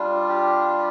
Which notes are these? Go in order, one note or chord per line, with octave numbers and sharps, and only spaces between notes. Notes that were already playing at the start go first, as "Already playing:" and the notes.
Already playing: G3 D4 F4
G4